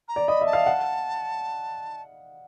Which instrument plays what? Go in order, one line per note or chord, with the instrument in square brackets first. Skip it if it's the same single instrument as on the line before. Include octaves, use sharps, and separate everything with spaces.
[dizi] A#5
[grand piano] D5
[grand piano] D#5 [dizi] B5
[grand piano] E5
[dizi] A5
[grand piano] F5
F#5